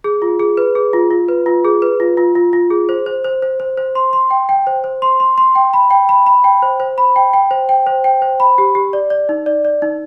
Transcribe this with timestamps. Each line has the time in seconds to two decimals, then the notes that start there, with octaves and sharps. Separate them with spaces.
0.04 G#4
0.22 F4
0.39 G#4
0.57 B4
0.75 G#4
0.93 F4
1.11 F4
1.28 B4
1.46 F4
1.65 G#4
1.82 B4
2.00 F4
2.17 F4
2.35 F4
2.53 F4
2.70 G#4
2.89 C5
3.06 C5
3.24 C5
3.42 C5
3.60 C5
3.77 C5
3.95 C6
4.13 C6
4.31 G5
4.49 G5
4.67 C5
4.84 C5
5.02 C6
5.20 C6
5.38 C6
5.55 G5
5.73 B5
5.91 G5
6.09 B5
6.26 B5
6.44 G5
6.62 C5
6.80 C5
6.98 B5
7.16 G5
7.34 G5
7.51 C5
7.69 G5
7.87 C5
8.04 G5
8.22 C5
8.40 B5
8.58 G4
8.75 G4
8.93 D5
9.10 D5
9.29 D#4
9.46 D5
9.65 D5
9.82 D#4